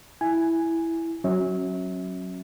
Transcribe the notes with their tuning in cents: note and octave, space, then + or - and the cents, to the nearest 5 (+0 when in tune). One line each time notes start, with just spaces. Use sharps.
E4 +0 G#5 +0
F#3 +0 C#4 -25 E5 -30